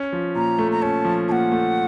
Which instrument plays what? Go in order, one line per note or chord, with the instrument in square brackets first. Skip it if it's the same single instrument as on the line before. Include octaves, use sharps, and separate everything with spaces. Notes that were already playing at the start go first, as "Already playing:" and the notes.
Already playing: [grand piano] C#4
F3
[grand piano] A#2 [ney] A#5
[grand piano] A3
[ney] A#5
[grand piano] C#4 [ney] A5
[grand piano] F3
[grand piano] A#2 [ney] F#5 A5
[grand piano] A3